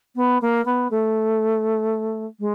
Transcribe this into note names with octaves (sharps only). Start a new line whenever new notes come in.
B3
A#3
B3
A3
G#3